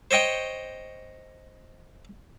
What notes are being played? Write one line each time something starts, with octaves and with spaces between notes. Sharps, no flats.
C5 C#5 D#5 G5 C#6